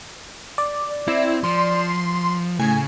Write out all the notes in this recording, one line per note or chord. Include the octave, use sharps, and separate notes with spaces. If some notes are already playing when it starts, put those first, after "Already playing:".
D5
C4 E4
F3 C6
A2 C#3 G#5